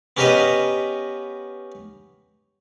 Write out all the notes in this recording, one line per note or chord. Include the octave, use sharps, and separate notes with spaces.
B3 C#4 G4 A#4 B4 D#5